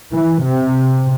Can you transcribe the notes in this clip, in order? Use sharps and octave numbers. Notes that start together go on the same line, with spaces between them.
E3
C3